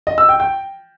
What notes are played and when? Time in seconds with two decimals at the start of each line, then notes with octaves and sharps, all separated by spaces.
0.07 D#5
0.18 E6
0.29 G5
0.40 G5